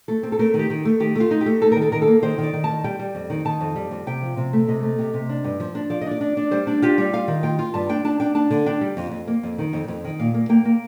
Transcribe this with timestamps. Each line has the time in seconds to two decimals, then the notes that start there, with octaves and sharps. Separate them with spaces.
0.08 A3 A4
0.23 C4
0.32 A4
0.39 A3 A#4
0.54 D#3
0.59 G4
0.70 D#3
0.85 A3
1.00 D#3 G4
1.15 A3 F4
1.31 D#4
1.41 G4
1.46 A3
1.61 D#4 A4
1.72 D#3 A#4
1.82 A4
1.92 D#3 A#4
2.02 A4
2.08 A#3
2.23 D#3 C5
2.38 D#3
2.43 D5
2.53 D#3
2.64 A5
2.69 D#3
2.84 G3 G5
2.99 G3
3.15 F2
3.30 D#3
3.45 D#3 A5
3.61 F2
3.76 G3
3.91 F2
4.07 C3 G5
4.22 F3
4.37 C3
4.53 A3
4.68 C3 D#5
4.83 A3
4.99 C3
5.14 C3
5.29 D4
5.44 G2
5.60 F3
5.75 D4
5.90 F3 D5
6.01 D#5
6.06 D4
6.11 D5
6.21 D4
6.37 D4
6.51 G3 C5
6.67 D4
6.82 F4 G4
6.98 G3
7.13 F4 F5
7.28 D#3
7.43 F4 G5
7.59 F4
7.74 G2 A5
7.89 D4 G5
8.04 D4 A5
8.20 D4 G5
8.35 D4 A5
8.51 D3
8.66 D4 G5
8.81 G3
8.97 F2
9.12 F2
9.27 A#3
9.43 F2
9.58 D#3
9.73 F2
9.88 F2
10.04 D#3
10.19 A#2 F5
10.34 A#3
10.49 A#3 G5
10.65 A#3